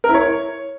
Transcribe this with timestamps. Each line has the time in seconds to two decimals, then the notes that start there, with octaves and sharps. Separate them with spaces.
0.04 A#4
0.09 E4
0.14 C#5